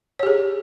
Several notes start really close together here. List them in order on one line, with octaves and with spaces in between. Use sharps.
C#5 G4 G#4